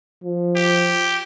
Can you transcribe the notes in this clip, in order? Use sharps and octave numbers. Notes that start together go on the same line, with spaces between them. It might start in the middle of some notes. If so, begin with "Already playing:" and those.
F3
G4